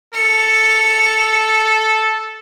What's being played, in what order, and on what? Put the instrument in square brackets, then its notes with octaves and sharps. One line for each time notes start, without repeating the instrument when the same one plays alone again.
[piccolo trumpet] A4 [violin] C#7 F7